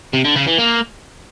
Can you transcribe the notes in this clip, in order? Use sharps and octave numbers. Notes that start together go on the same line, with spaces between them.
C3
D3
C#3
E3
A#3